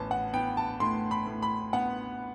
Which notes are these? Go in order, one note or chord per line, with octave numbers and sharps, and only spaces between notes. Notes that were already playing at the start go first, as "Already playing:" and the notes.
Already playing: A1 B3 A5
F#5
B3 G5
A5
A2 C6
B5
A2
B5
B3 F#5